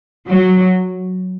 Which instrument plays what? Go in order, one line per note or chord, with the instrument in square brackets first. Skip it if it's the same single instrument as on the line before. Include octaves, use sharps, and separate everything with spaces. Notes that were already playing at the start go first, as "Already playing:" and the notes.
[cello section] F#3